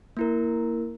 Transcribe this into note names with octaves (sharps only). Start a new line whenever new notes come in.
A#3 E4 A#4